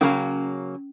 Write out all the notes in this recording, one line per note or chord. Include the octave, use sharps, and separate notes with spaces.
C#3 F#3 A#3 C#4